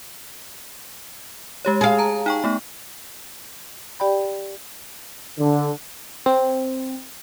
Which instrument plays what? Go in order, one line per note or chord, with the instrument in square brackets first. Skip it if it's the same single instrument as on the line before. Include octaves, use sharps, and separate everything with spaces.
[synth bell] G#3 G4 C#5
[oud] G#4 F5
[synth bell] A5 A#5
D#4 G5 C#6
A3 B3 D#4
[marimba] G4 D5 G5 B5
[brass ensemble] D3
[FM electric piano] C4